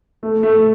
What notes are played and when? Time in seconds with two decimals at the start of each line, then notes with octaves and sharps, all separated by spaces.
0.23 A3
0.43 A3